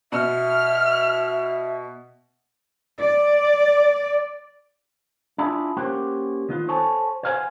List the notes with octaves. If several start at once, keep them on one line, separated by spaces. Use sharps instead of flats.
B2 E5 F6 C#7
D5
D4 E4 F4 G#4
A#3 C#4 G4 C5 F#5
D#3 B3 F4
A4 C5 C#5 G#5 A5
B4 C5 F5 F#5 G#5